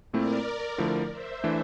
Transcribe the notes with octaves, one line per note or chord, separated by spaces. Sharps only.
A#2 A3 C4 E4 A#4 D5
D3 F3 A3 E4
C5 E5
E3 A3 D4